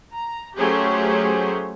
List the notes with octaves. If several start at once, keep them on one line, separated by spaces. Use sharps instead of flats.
A#5
F#3 A3 C#4 G4 G#4 C5